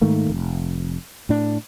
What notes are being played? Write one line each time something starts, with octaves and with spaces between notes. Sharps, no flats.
G#2 D#3 A3 A#3
F1
A2 D4